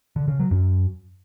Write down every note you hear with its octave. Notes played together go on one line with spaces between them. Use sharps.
D3
C#3
F#3
F#2